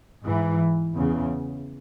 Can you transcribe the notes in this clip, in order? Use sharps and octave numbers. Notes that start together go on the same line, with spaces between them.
G#2 E3
E2 C#3